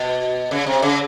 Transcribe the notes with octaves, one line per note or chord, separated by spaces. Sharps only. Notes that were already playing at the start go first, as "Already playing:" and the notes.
Already playing: B2
C#3
C3
C#3